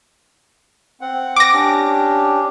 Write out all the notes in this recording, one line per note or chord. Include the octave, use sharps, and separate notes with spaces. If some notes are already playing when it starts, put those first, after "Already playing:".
C4 F#5
D6 A#6
C#4 D4 G4